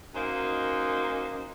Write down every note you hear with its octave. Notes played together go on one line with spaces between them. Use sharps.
F#2 A#3 D#4 C5